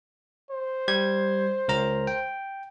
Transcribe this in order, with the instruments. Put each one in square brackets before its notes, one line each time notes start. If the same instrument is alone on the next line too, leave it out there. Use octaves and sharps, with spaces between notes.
[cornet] C5
[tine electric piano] G3 G#6
C#2 A#4 A#5
G5